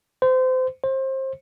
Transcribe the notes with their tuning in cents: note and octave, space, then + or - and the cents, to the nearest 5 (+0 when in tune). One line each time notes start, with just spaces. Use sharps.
C5 -30
C5 +25